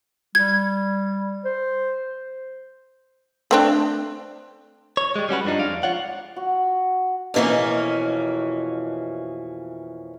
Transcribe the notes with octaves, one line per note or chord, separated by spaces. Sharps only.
G3 G#6
C5
A3 C4 D4
C#5
G3 G#3
G3 C#4 F#4 B4
G2 F3 C4 D4 D#4
F2 G#3 D5 F5
F4 C#5 F#5
F#4
F2 B2 E3 A#3 C#4